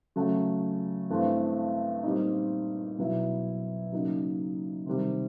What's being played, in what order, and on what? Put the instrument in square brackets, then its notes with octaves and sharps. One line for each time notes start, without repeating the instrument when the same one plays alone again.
[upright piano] C#3 F#3 A3
G2 E3 A3 C4
A#2 G3 C4 D#4
B2 F#3 B3 E4
C#3 F#3 A#3 D#4
C3 D#3 G3